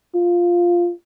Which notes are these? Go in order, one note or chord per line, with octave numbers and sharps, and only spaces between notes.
F4